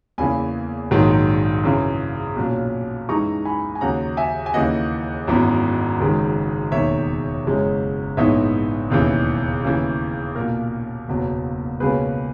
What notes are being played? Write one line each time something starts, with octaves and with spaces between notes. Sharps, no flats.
E2 C#3 E3 A#3 G#5 B5
A#1 G#2 D#3 F#3
F#2 C#3 E3
B1 A#2 F#3 C#4
F#2 E3 G#3 D#4 A#5 C#6
G#5 B5
G#5
D#2 C#3 F#3 F#5 A#5
E5 G#5
G#5
D#2 C#3 E3 A#3 D#5 F#5
G#1 F#2 E3 B3
F#1 F#2 D#3 G#3
E1 D#2 D#3 C#5 E5
F#1 F#2 E3 G#3 C#4
A#1 G#2 E3 B3 D#4 C#5 E5
E1 D#2 C#3 E3
D#2 C#3 E3
B1 A#2 A#3 A#4
F#1 E2 B2 F#3 A#3
C#2 B2 A#3 C#4 G#4 B4